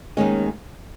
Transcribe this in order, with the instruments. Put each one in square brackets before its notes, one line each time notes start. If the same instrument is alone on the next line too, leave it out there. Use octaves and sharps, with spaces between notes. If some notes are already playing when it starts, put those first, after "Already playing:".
[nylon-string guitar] D#2 D#3 G#3 C#4